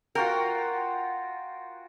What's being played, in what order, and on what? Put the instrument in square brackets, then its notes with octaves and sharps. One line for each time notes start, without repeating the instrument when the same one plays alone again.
[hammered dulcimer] F4 F#4 G5 [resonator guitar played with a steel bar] A#4